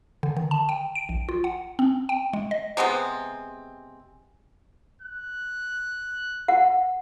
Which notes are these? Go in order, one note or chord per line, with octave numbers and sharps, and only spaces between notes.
D3
D#3
A5
G5
D7
A#1
F4
F#5
C4
G5
G#3
D#5
C3 G#3 B3 C4
F#6
F#5